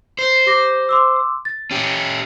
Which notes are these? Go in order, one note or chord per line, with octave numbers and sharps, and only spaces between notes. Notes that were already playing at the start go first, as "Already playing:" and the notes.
C5
G4 D6 A#6
C6 D6 E6
A6
C#4 G4